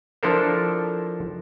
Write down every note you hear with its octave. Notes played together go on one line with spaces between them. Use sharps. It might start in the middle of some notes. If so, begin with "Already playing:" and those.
F3 D4 E4 A4 A#4 C5